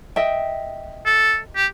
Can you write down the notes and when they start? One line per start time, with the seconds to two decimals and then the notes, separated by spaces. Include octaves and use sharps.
0.16 D#5 E5 G5
1.06 A4
1.56 G4